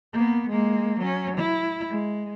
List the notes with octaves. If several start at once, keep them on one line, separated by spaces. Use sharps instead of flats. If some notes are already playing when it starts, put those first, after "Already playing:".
A#3 B3
G#3 A#3
F#3 C#4
E4
G#3